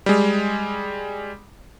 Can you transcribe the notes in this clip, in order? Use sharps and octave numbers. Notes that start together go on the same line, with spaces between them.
G3 G#3